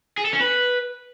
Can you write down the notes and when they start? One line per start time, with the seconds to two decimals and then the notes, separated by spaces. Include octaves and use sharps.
0.18 G#4
0.25 A4
0.33 C#4
0.41 B4